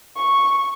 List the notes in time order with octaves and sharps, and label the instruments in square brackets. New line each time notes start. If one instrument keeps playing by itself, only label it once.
[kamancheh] C#6